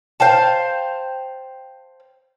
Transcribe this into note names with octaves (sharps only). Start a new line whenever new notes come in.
C5 F5 G5 A5